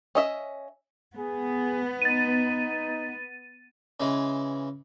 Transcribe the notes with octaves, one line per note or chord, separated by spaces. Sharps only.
C#4 D#5 E5
B3 G#4
D#4 A6 D#7
C#3 E3 G#3